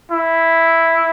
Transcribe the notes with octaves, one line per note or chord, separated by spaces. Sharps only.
E4